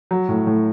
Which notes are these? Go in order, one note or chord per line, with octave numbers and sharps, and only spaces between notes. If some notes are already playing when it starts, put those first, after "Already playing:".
F#3
A2
A2